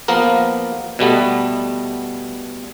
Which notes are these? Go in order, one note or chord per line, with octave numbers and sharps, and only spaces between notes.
F3 A#3 B3 A#4
B2 G3 A3 B3